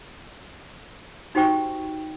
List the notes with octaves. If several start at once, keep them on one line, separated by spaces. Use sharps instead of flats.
D#4 F#4 G4 C5 G5 C#6